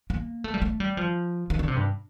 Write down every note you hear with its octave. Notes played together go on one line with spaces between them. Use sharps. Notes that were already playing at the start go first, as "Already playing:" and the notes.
A#3
A3
G3
A3
G3
F3
D#3
D3
C3
G2